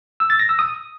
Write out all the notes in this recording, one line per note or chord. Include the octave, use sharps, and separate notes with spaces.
E6
A6
A#6
E6
D#6